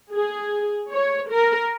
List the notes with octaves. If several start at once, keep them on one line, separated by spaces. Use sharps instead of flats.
G#4
C#5
A#4